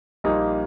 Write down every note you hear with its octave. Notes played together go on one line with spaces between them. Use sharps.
A#1 A#2 G3 A#3 D#4